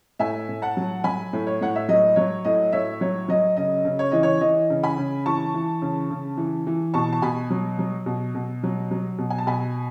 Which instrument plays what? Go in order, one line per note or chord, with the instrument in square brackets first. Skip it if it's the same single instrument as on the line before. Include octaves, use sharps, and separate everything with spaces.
[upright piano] A2 E5 G#5
A2
F#5 A5
F#3
F#3 G#5 B5
A2
C#5
A2 F#5
E5
F#3 D#5
F#3 C#5
A2 D#5
A2 C#5 E5
F#3 C#5
F#3 D#5
C#3 D#5
C#3
C#5
E3 D#5
C#5
E3 D#5
C#3
G#5 B5
C#3
E3 A5 C#6
E3
C#3
C#3
E3
E3
B2 A5 C#6
A5
B2 G#5 B5
F#3
F#3
B2
B2
F#3
F#3
B2
G#5
A5
B2 G#5 B5